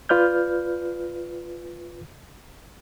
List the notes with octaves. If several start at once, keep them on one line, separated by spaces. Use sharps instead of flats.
F4 B4 D5 F6 G6